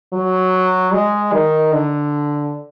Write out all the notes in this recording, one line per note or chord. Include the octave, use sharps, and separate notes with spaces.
F#3
G#3
D#3
D3